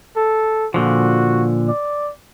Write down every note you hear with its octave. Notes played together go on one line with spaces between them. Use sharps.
A4
A#2 D3 F3 F#4
D5